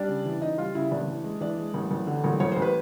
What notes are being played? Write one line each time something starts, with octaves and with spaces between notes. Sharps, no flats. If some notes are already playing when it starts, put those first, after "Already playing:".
Already playing: G3 D4 D5
C#3
E3
C#3 D#4 D#5
G3 F4 F5
C#3 E4 E5
A1 D4 D5
E3
G#3
E3 D4 D5
G#3
A1
A1
D3
A1
A1 C#5
A1 C5
B4